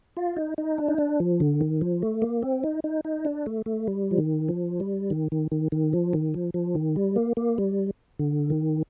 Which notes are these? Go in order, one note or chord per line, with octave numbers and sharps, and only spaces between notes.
F4
D#4
D#4
D4
D#4
D4
F3
D3
D#3
F3
A3
A#3
C4
D#4
D#4
D#4
D4
A3
A3
G3
F3
D#3
F3
G3
D#3
D#3
D#3
D#3
F3
D#3
F3
F3
D#3
G3
A#3
A#3
G3
D3
D#3